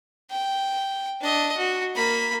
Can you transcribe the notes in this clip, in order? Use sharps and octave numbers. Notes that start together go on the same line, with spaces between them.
G5
D4 D#5
F#4
A#3 B5